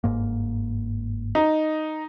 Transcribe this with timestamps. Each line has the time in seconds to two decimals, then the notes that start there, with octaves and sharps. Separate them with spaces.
0.04 G1 G#2 A#3
1.35 D#4